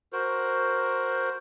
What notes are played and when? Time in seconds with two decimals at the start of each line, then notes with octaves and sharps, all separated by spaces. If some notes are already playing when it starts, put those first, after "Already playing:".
0.13 F#4 A#4 C5